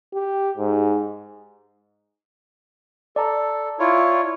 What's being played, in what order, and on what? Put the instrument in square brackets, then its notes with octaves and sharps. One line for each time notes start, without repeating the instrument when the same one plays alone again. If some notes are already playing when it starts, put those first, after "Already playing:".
[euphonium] G4
G#2
[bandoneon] A4 [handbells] D5 A5 A#5
[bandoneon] E4 F4 C#5